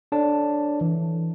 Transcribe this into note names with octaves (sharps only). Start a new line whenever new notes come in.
D4 A4 C#5 D5 A5
E3